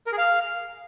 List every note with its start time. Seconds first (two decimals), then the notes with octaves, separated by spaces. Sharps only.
0.06 A#4
0.12 G#4
0.18 F5